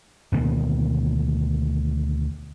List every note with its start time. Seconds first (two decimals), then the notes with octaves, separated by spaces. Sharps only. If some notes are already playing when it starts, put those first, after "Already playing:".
0.32 D2 B2 D#3 A#3